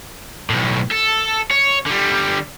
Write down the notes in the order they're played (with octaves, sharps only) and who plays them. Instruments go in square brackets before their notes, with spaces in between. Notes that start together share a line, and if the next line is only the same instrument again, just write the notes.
[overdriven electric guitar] B1 A2
A4
C#5
D3 G3